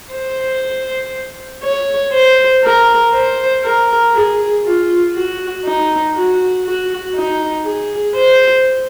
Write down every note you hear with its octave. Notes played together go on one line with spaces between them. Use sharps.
C5
C#5
C5
A#4
C5
A#4
G#4
F4
F#4
D#4
F#4
F#4
D#4
G#4
C5